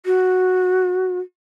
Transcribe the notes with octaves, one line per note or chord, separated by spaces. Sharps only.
F#4